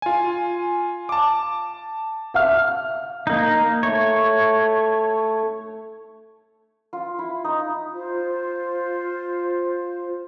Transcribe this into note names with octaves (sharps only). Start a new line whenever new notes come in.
F4 G#5
A5 D6
E5 F5 F6
A#3 D#4
A3 C#5
F4
E4
D#4
F4 C5